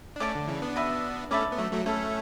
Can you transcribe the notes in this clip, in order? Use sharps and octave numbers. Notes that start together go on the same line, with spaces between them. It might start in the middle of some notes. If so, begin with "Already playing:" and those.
D4
A3 C#4 D5 A5 D6
D3
C#3 E3
B3 D4
F#4 B4 E5
A3 C#4 A4 E5 B5 D6
B3
F#3 A3
F#3 A3
A3 C#4 E4 A4 E5